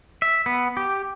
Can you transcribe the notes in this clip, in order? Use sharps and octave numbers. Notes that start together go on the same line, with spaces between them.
E5
B3
G4